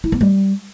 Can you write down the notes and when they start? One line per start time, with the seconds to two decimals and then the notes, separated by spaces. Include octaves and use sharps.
0.04 E4
0.12 B3
0.21 G3